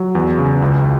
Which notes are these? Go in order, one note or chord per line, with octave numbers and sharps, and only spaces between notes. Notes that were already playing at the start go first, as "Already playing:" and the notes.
Already playing: F#3
E2
C#3
C#2